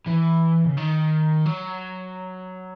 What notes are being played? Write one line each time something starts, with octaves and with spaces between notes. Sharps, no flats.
E3
C#3
D#3
F#3